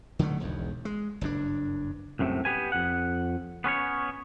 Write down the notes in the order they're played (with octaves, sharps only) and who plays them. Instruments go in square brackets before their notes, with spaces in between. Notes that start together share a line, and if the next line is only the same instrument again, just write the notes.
[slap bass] D3 D#3 F#3 A3
E1 B1 E2
G#3
F#1 G2 D4
[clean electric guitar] C2 F#2 A2 C3
B3 G4 B4 G#5
F2 F#5
B3 C#4 B4 C#5